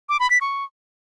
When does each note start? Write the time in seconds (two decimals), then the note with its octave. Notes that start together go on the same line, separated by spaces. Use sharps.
0.09 D6
0.20 B5
0.30 B6
0.41 C#6